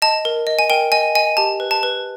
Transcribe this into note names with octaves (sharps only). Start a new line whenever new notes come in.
D#5 A5
A#4
D#5
G#5
A#4 G5
D#5 G#5
D#5 G#5
G4 A5
B4
A5
B4